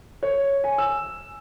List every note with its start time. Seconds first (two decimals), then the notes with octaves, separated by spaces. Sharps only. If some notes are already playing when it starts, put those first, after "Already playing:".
0.23 C#5
0.64 G#5
0.78 E6